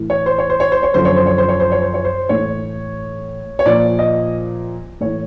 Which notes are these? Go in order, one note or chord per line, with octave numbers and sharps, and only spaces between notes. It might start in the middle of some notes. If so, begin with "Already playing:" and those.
Already playing: A2 E3
C#5
C5
C#5
C5
C#5
C5
C#5
F#2 D3 F3 C5
C#5
C5
C#5
C5
C#5
C5
C#5
C5
C#5
C5
A2 E3 C#5
C#5
A#2 F3 D5
D#5
A2 E3 C#5